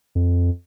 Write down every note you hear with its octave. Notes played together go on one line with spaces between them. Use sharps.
F2